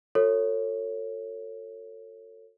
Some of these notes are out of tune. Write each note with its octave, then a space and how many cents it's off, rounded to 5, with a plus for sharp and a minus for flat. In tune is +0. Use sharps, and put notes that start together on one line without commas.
F#4 -25 A4 +35 C#5 -10